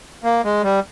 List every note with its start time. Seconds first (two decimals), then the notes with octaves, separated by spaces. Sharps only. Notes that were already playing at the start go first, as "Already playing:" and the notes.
0.24 A#3
0.44 G#3
0.63 G3